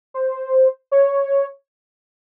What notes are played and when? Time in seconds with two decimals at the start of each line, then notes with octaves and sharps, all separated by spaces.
0.14 C5
0.92 C#5